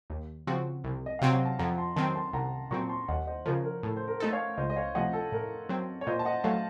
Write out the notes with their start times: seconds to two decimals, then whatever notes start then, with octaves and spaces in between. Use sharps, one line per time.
0.10 D#2
0.47 C#3 F3 C4 F#4
0.84 C2
1.06 D#5
1.19 C3 F#3 C4 F5
1.33 F#5
1.45 A5
1.59 F2 F#5 A#5
1.78 A5 C6
1.96 D#3 F#3 C4 A5 C6
2.15 A5 C6
2.33 C2 F#5 A#5
2.71 A#2 F#3 C4 A#5 C#6
2.89 A5 C6
3.08 D#2 D#5 F#5
3.27 C5 D#5
3.46 C#3 F3 A#4 C#5
3.64 A#4
3.83 A2 A4
3.96 C5
4.08 A#4
4.20 A3 D#4 A4
4.33 C#5 F5
4.57 C#2 C5 D#5
4.70 D#5
4.76 C#5 F5
4.95 C3 F3 A3 D#4 D#5 F#5
5.13 A4
5.32 A2 A#4
5.69 F#3 C4
6.01 C#5
6.07 A#2 C5 D#5
6.19 A5
6.25 D#5 F#5
6.44 F#3 A3 F5 A5